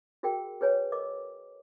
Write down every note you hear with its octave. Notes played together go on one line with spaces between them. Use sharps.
F#4 G#4 A#4 G5
G#4 B4 C#5 G#5
A#4 D#5 D6